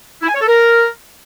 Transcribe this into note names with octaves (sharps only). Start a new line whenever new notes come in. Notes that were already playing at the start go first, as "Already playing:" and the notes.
E4
G#5
C#5
A4
A#4